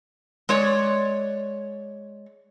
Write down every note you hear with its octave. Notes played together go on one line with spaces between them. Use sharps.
G#3 C#5 D5